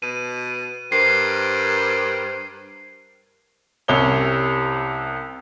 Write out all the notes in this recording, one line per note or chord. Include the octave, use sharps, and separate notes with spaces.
B2 D#7
G2 A#4 C5 G5 C7
C2 C3 C#4 G7